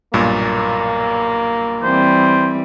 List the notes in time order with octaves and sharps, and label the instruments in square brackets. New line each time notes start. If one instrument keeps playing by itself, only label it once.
[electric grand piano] B1 G2 A#2 [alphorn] A#3
[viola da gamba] E3 G3 C4 [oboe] C5